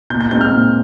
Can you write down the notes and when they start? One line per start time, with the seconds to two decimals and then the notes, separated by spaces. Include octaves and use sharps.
0.10 A#2 G6
0.21 G6
0.31 G#3 C4 D#4 G6
0.41 F6
0.52 A#2